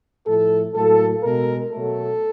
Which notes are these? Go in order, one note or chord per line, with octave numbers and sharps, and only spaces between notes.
A2 F3 A3 A4
A2 F#3 A#3 A4
B2 G#3 A#4
B2 F#3 A3 A4